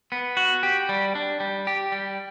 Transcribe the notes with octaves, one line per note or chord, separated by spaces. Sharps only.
B3
F#4
G4
G3
D4
G3
G4
G3